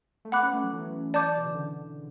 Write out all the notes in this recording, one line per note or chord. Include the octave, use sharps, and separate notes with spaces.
A3
B3 F#5 B5 D6 F#6
C#4
A3
F#3
E3
D5 A5 D6 G6
B2
C#3
D3